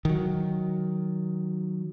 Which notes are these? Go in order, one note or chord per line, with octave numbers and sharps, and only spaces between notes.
D#3 F#3